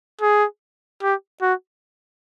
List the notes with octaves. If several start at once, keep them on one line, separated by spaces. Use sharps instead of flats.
G#4
G4
F#4